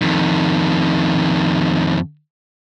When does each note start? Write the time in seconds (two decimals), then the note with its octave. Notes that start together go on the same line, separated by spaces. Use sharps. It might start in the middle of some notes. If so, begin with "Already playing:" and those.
0.02 F2 D#3